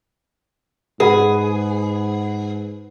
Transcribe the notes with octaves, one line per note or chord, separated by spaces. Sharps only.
G#2 G#4 B4 F#5 B5